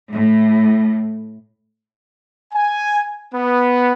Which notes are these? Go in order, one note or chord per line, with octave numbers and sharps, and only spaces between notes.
A2
G#5
B3